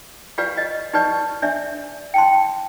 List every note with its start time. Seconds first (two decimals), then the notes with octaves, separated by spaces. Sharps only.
0.38 F4 G4 B4 D5 F5
0.57 D#5
0.93 D#4 G4 B4 D5 C#6
1.42 D4 D5 E5
2.14 G5 A5 C6